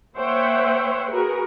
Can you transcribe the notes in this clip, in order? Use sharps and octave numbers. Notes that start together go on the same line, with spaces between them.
A#3 C5 C#5 E5 F#5 G5
F#4 G#4 A#4 B4